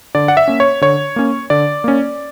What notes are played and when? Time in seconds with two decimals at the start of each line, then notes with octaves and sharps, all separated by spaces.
0.15 D3 D5
0.28 F#5
0.37 E5
0.48 A#3 C#4
0.60 C#5
0.81 D3 C#5
1.16 A#3 C#4
1.50 D3 D5
1.84 A#3 C#4